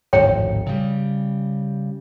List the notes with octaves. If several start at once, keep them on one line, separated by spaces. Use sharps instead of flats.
D1 G#1 F2 C#5 G5
C#3 G3